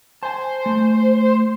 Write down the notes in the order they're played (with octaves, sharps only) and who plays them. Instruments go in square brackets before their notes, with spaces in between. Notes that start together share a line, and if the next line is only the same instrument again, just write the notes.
[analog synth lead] C5 [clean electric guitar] G#5 A5
[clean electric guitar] A3